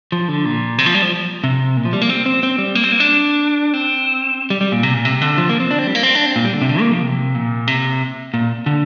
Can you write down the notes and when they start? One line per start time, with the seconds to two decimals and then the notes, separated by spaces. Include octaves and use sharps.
0.12 F3
0.28 D3
0.45 A#2
0.78 C3
0.86 F3
0.94 G3
1.02 F3
1.44 C3
1.77 A#2
1.85 F3
1.93 G3
2.01 A#3
2.09 C4
2.26 C4
2.43 C4
2.58 G3
2.75 A#3
2.84 C4
2.92 A#3
3.00 D4
3.74 C4
4.50 G3
4.61 G3
4.72 A#2
4.83 C3
4.94 A#2
5.05 C3
5.21 D3
5.38 F3
5.49 A#3
5.60 C4
5.71 D4
5.79 C4
5.87 G3
5.95 A#3
6.03 C4
6.15 D4
6.26 C4
6.36 A#2
6.45 G3
6.53 D3
6.61 C3
6.69 D3
6.80 A#3
6.92 F3
7.02 C3
7.35 A#2
7.67 C3
8.34 A#2
8.66 D3